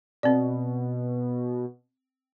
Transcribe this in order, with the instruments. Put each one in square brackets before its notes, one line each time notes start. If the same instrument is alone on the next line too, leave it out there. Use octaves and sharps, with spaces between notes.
[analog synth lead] B2 [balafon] C4 D5